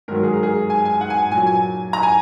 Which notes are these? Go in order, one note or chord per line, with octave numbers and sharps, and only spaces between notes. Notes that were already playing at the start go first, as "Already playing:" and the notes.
G#2 D#3 F#3 A#4
G#4
A#4
G#4
G#5
G#5
F#5
G#5
A#2 F#3 G#5
G#5
A#5
G#5